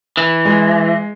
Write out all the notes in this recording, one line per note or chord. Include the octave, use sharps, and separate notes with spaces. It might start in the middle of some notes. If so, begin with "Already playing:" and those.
E3
G#3